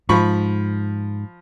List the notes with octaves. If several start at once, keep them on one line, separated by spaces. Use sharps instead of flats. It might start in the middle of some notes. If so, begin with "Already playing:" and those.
G#2 F3 B5 C#6